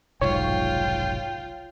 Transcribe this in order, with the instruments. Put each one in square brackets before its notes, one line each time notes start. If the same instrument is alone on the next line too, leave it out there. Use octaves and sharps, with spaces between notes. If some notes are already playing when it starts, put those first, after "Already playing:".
[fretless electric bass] F1 B1 G#2 [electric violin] F4 [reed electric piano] C#5 [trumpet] G5